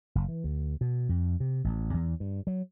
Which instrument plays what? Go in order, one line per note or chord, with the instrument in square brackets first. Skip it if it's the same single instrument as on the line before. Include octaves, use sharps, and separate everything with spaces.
[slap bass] F#1
E3
D2
B2
F2
C3
A1
E2
G2
F#3